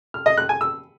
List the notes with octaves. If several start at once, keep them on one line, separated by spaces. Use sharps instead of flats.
F6
D#5
F#6
G#5
E6